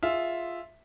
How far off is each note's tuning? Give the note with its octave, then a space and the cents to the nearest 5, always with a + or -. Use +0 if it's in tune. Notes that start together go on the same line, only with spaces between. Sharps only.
F4 +0 G#4 +0 E5 +0